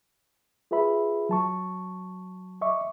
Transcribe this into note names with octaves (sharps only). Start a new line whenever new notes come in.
F4 G#4 B4 E5 B5
F#3 A5 C#6
D#5 E5 C#6 D6